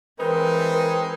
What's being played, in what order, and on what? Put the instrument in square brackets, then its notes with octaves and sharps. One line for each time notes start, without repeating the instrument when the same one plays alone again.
[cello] E3 [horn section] G#3 C4 D#4 [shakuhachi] A#4 [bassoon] B4